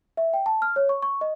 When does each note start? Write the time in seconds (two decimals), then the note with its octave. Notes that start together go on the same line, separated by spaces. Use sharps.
0.17 E5
0.33 G5
0.46 A5
0.62 F6
0.76 C#5
0.89 C#6
1.02 C#6
1.21 D#5